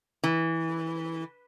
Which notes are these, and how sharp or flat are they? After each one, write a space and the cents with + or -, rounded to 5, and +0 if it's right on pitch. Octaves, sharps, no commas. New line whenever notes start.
E3 -10